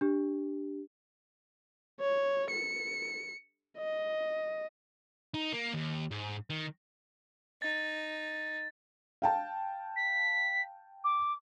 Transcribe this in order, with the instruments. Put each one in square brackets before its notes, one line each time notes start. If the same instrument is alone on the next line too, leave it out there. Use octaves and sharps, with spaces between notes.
[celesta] D4 G4
[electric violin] C#5
C#7
D#5
[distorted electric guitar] D#4
A#3
D#2
G#2
D#3
[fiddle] D#4 [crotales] A6
[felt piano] F5 G5 A5
[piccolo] B6
D6